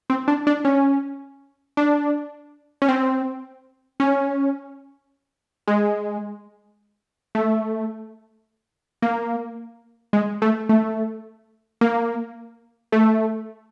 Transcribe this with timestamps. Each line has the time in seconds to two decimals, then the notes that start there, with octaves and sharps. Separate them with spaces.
0.10 C4
0.28 D4
0.47 D4
0.65 C#4
1.77 D4
2.82 C#4
2.88 C4
4.00 C#4
5.67 G#3
7.35 A3
9.02 A#3
10.13 G#3
10.42 A3
10.69 A3
11.81 A#3
12.92 A3